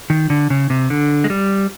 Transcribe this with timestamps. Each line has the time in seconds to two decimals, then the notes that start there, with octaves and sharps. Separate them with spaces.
0.10 D#3
0.30 D3
0.50 C#3
0.70 C3
0.90 D3
1.24 G#3
1.30 G3